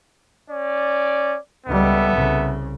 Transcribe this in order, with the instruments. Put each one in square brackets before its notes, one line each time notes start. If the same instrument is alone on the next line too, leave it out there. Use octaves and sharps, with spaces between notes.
[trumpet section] C#4 D5
[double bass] C#2 G3 [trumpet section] B3 A4 E5
[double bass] C2 C#3